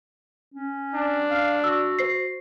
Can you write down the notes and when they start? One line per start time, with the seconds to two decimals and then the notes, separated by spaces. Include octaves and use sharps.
0.55 C#4
0.95 D4
1.30 F5
1.64 F#4 E6
1.99 C5 C7